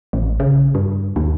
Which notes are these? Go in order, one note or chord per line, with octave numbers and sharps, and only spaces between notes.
A1
C#3
G2
D#2